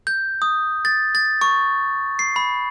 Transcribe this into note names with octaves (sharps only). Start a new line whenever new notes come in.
G6
D#6
A6
A6
C#6
C7
B5